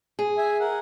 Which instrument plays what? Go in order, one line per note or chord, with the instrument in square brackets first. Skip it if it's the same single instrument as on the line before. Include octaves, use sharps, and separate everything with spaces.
[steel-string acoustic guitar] G#4
[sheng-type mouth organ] E5 G#5
A#4 F#5